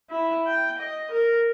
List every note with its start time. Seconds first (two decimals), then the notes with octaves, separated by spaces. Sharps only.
0.10 E4
0.47 G5
0.79 D#5
1.11 A#4